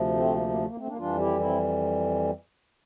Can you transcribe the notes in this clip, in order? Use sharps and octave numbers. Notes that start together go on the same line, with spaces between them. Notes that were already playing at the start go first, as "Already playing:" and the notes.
Already playing: D2 C3 F3
A3 C4
A#3
A#3
A3
A#3
A3 C4
A#3 D4
F2 E3 G3 D4 F4
E4 G4
C4 E4